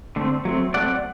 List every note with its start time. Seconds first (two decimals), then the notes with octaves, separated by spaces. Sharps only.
0.16 D3 A3 C4
0.45 F#3 A3 C4
0.74 F#3 A3 C4 D5 F#5